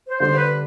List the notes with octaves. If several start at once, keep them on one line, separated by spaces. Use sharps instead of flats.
C5
D3 G3 D4 G4 C5
B4